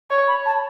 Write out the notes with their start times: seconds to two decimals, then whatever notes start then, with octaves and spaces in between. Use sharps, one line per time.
0.11 C#5
0.28 B5
0.46 A5